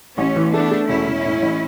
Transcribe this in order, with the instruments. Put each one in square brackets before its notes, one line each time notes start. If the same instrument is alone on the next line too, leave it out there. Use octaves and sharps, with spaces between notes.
[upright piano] A1 [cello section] A3 C#4
[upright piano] E3
[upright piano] A3 [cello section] B3 D4
[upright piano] A3
[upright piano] E1 [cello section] C#4 E4
[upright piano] E1
A2
A1